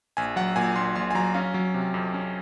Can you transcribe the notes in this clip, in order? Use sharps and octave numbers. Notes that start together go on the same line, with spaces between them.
A#1 G#5
F#3 F#5
A#2 G#5
A#1 C6
A#1 C6
G#5
F#3 A#5
C#4 F5
F#3
C3
F2
C#4